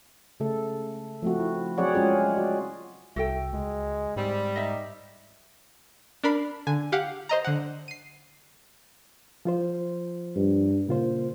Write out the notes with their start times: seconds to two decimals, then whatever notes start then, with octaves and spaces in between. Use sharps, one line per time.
0.40 C#3 A3 A4
1.22 F3 A3 C4 F#4
1.39 E4
1.78 F#3 C4 G#4 C#5 D5 F#5
1.94 G#3 C#4 F4 G#4
2.35 F#4 D5
3.16 C2 F#4 A4 E5 G5
3.53 C#2 G#3
4.16 G#2 G3 C4
4.56 D#4 D#5 E5
6.24 D4 A#4 B5 C7
6.67 D3 G#5
6.92 G4 F5 F#5
7.29 C5 D#5 A#5
7.45 D3 F#5
7.88 C7 D#7
9.45 F3 F4 C5
10.36 G2
10.89 A#2 C#3 F4 C5